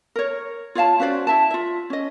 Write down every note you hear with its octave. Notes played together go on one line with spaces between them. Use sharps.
A#4 C#5
F4 C#5 F5 A5
C#4 F#4 C5 D5
E4 E5 A5
F4 E5
C#4 D#5